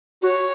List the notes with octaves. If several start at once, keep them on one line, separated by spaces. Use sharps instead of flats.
F#4 C#5